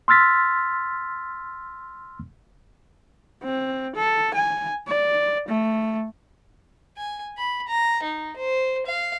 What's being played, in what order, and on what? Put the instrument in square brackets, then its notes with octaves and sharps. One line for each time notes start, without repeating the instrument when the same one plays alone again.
[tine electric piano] C6 E6 F6 A6 B6
[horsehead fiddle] C4
A4
G#5
D5
A3
[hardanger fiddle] G#5
B5
A#5
D#4
C5
F5